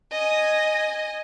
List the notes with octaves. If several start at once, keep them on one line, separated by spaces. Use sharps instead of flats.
D#5 G#5